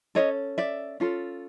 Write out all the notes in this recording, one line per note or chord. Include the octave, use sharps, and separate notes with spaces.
C#4 F4 A4 C#5 D#5
D5 E5
C#4 F4 A4